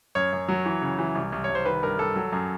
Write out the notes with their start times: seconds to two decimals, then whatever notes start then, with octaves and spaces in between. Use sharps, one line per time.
0.15 F#2 C#5
0.32 F#2
0.48 F#3
0.66 E3
0.82 C#3
0.99 E3
1.15 C2
1.32 C2
1.44 C#5
1.49 C2
1.55 C5
1.66 D#3 B4
1.83 G2 A#4
1.99 G2 A4
2.16 F#3
2.32 F#2